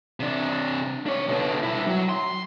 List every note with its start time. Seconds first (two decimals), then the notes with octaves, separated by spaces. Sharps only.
0.20 C3 D4
1.06 D4 C#5
1.29 B2 D3
1.63 G3 E4
1.87 F#3
2.09 C6